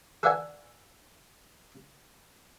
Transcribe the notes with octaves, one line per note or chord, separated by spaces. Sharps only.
A4 B4 D5 E5 F#5 G#5